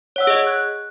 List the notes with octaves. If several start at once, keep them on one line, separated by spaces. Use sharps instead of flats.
C#5 F#5 E6
G#4 D#5
F#6